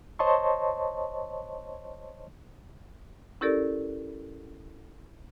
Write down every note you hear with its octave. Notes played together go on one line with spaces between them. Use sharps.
C5 C#5 D#5 A5 C6 C#6
C#4 E4 G4 A4 A#4 D5